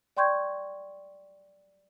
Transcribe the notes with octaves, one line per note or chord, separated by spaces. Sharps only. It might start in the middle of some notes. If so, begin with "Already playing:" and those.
D5 G5 C6 C#6 G6 G#6